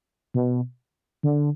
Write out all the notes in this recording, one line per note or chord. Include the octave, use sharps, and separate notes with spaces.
B2
D3